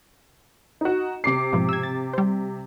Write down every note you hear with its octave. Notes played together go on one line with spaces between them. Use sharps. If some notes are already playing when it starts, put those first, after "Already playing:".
D#4 F#4
C3 D6 C7
G#2 B2 F3
E6 G#6
A6
G3 C5